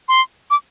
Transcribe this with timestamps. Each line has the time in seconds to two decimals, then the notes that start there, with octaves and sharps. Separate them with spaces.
0.08 C6
0.50 D6